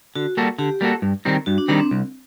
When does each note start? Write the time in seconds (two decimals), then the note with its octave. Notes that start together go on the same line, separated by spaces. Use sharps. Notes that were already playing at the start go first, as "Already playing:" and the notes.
0.15 D3 F#4
0.37 G3 A#3 F#4 A4
0.58 D3 G4
0.81 G3 A#3 F#4 A4
1.02 G2
1.25 D#3 G3 C4 D#4
1.46 G2 F#4
1.58 D4
1.68 D#3 G3 C4 D4 D#4
1.80 C4
1.91 C2